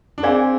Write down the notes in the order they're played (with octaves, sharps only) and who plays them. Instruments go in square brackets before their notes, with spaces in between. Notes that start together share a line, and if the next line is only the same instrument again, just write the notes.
[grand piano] D4
[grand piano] C4 [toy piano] G#4 D5 F5 G#5 C6